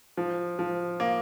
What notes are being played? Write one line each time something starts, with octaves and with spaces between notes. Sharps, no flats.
F3
F3
A#3